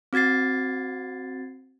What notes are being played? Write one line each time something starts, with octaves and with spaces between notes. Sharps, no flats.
C4 F#4 G#6 A6 C7